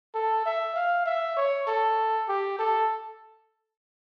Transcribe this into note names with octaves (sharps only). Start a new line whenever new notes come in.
A4
E5
F5
E5
C#5
A4
G4
A4